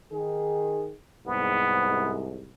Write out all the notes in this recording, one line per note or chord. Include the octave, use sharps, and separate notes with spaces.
D#3 G#4
C2 G#2 B3